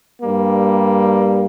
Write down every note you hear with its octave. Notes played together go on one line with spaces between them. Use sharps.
G2 G3 A#3